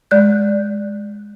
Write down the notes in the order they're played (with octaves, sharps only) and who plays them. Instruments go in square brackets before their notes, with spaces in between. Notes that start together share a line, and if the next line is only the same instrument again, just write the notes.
[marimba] G#3 D5 F#6 G6